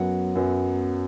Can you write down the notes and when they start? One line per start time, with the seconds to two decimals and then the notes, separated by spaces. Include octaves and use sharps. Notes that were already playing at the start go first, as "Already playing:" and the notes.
Already playing: F#2 F#3 B3 F#5
0.35 F#2 F#3 B3